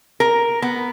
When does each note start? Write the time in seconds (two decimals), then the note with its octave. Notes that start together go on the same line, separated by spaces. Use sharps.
0.20 A#4
0.62 B3